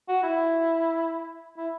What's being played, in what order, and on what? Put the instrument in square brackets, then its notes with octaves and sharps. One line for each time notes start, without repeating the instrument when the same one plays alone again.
[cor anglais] F#4
E4
E4